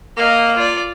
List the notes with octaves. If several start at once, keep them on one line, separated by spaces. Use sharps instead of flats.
A#3 D#5 F5
F4 D5